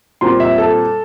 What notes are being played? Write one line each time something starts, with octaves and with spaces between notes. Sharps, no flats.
A#2 G3 C4 C6
E5
A4